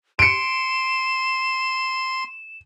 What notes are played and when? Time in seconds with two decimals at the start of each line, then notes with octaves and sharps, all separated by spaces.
0.19 C6 C#7 D7 E7